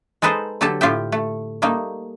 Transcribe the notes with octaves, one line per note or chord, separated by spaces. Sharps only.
G#3 D#4 A4 B4 C5 D#5
D3 F#3 G4 A4 A5
A2 F4 G4 E5 G5
A3
G3 A3 A#3 D#4